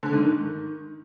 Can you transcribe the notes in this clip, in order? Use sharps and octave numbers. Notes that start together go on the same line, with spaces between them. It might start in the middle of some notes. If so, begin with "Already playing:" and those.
D3
G#2
D#3